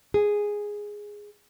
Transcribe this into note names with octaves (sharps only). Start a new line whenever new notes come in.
G#4